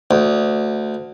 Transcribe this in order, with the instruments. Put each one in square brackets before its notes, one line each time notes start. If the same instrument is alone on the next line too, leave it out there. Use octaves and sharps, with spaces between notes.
[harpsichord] D2